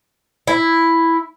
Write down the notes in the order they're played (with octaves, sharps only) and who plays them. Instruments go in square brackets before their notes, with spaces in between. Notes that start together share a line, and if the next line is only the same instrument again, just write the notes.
[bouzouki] E4